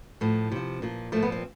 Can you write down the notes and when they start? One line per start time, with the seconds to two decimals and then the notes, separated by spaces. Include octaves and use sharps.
0.21 A2 F3
0.52 C3 F3
0.82 A#2 F3
1.12 A#2 F3 A3
1.22 B3
1.32 C4